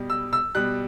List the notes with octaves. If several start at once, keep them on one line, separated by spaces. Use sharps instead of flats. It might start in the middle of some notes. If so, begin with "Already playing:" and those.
Already playing: B2 G3
E6
E6
B2 G3 F#6